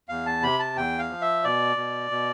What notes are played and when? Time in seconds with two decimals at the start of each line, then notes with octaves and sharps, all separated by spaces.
0.09 E2 F5
0.26 A5
0.43 C3 B5
0.59 A5
0.76 E2 G5
0.99 F5
1.10 F3
1.21 E5
1.44 B2 D5
1.77 B2
2.11 B2